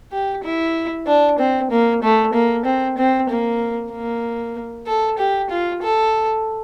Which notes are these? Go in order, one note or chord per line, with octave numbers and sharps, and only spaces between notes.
G4
E4
D4
C4
A#3
A3
A#3
C4
C4
A#3
A#3
A4
G4
F4
A4